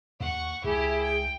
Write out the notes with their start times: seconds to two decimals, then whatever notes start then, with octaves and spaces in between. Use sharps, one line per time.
0.20 D#2 F#5 C#6
0.64 C#2 E4 G4 G#4
1.02 G5